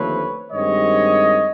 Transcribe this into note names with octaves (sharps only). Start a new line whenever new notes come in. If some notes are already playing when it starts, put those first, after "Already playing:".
Already playing: D#2 D3 F3 A3 C4 B4 C#5
G2 D#3 G#3 C4 C#5 D#5